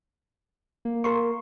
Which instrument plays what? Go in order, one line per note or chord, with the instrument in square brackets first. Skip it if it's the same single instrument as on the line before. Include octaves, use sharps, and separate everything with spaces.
[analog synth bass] A#3
[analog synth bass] A#3 [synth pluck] A#4 C6 C#6